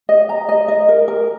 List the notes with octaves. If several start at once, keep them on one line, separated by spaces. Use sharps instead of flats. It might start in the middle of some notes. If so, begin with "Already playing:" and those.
D#5
A#5
D#5
D#5
A#4
A#4